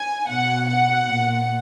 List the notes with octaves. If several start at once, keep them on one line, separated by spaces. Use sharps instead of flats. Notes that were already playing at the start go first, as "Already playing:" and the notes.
Already playing: G#5
B2 F#5
F#5
A#2